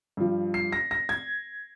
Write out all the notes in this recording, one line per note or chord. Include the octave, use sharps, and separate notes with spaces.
G2 F3
C7
A#6
A#6
G#6